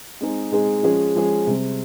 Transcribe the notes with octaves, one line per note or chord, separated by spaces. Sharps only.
G#3 C4 D#4 G#4
G#3 C4 D#4 G#4
F3 G#3 C#4 G#4
F3 G#3 C#4 G#4
C3 G3 C4